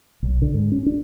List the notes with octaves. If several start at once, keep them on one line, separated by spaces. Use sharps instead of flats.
B1
D3
G#2
C#4
D4